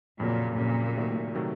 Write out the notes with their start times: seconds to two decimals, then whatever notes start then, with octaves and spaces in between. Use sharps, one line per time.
0.20 F2 A#2 C#3 F#3 A#3 C#4
0.58 F2 A#2 C#3 F#3 A#3 C#4
0.97 C3 D#3 F#3 A3
1.35 C3 D#3 F#3 A3